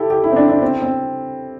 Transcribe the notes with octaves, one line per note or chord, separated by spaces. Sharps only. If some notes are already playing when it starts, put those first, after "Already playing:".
Already playing: E4 G4 A4
G4
E4
C4
D4
D4
C4
C4